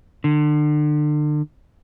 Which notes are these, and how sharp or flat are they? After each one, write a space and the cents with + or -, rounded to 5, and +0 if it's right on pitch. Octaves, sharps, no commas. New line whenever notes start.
D3 +35